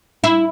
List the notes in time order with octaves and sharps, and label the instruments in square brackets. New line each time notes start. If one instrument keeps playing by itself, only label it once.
[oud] E4